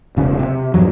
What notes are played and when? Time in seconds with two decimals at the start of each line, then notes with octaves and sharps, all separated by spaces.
0.17 E1 C#3
0.39 C3
0.74 E2 G2 F3 F#3